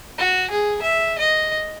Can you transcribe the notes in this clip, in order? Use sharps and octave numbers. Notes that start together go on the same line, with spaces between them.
F#4
G#4
E5
D#5